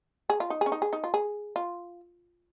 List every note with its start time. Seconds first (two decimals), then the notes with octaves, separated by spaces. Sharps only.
0.30 G#4
0.40 F4
0.50 D#4
0.61 G#4
0.66 C#4
0.72 D#4
0.82 G#4
0.93 D#4
1.04 F4
1.14 G#4
1.56 F4